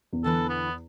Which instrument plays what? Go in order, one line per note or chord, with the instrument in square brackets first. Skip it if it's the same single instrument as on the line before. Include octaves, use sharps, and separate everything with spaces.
[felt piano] E2
[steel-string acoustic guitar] D3 E3 B4 [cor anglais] A4
[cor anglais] B3